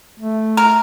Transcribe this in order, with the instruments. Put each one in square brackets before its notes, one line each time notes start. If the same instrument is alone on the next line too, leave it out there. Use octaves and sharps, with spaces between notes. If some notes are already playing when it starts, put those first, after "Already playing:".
[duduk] A3
[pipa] A#4